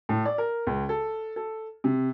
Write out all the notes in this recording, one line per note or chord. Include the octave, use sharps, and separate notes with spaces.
A2
D5
A#4
C#2
A4
A4
C3